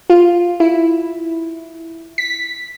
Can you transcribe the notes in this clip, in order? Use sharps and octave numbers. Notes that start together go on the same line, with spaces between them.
F4
E4
B6